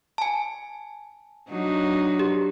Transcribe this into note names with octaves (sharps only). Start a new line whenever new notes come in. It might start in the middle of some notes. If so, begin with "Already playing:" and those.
G#5 A5
F#3 D4 D#4
G4